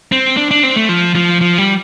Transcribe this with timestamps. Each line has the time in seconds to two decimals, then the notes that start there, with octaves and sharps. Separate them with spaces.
0.12 C4
0.37 D4
0.51 D4
0.63 C4
0.76 A3
0.89 F3
1.15 F3
1.41 F3
1.58 G3